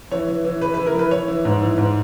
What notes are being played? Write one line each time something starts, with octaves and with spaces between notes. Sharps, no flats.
E3 C#5
E3
E3
E3 B4
E3 B4
A#4
E3 B4
E3 C#5
E3
G#2
E3
G#2